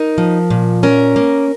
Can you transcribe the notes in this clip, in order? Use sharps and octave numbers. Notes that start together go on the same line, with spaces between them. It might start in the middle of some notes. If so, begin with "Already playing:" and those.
Already playing: D#4 A#4
F3
A#2
C#4 A#4
A#3